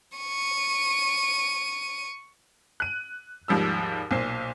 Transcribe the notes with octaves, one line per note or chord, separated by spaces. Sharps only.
C#6 D#7
F#6 D#7
D#2 G#2 F3 G3 E6
B1 A#2 C5 C7